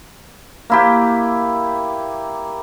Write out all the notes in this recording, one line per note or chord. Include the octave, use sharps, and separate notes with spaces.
A#3 E4 G4